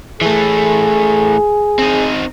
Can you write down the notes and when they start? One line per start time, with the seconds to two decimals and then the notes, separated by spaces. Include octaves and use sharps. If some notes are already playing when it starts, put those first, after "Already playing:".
0.21 E3 A3 G#4
1.79 C4 D#4